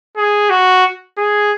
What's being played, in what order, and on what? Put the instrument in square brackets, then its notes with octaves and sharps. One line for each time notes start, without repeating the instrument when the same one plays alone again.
[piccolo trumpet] G#4
F#4
G#4